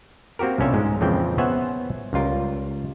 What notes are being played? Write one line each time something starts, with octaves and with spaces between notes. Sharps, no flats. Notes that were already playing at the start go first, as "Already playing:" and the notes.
A#3 C4 F#4 G4 A#4
C2 B2 D3 C#4 F4 E5
G#2 G#3
F2 A#2 C#3 E3 C4 G5
B3 C5 C#5 E5 F#5 G#5
C#2 G3 F4 A#4